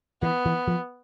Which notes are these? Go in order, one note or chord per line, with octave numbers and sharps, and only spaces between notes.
E3 B3
E3
F3